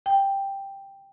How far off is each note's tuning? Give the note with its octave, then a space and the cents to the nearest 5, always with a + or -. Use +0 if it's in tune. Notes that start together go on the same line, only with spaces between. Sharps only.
G5 +5